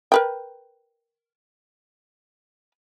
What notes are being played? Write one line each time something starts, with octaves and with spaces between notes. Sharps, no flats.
A#4 B4 G5